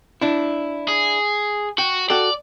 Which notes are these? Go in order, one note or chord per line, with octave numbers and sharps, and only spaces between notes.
D4 E4
G#4
F#4 G5
F#4 A4 D5 G5